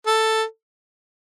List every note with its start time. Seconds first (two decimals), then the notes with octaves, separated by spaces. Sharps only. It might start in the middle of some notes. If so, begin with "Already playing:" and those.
0.07 A4